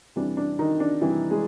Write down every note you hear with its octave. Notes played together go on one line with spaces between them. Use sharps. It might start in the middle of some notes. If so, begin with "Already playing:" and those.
F2 C3 E3 G3 D4
D4
D#3 D#4
D4
F2 C3 E3 G3 E4
G#3 G#4